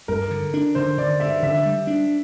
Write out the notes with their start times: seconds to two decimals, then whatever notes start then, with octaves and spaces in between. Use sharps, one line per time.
0.08 G2 A#4
0.31 D3
0.54 D4
0.75 D3 C5
0.98 D3 D5
1.20 G2 E5
1.42 D3 E5
1.65 G3
1.87 D4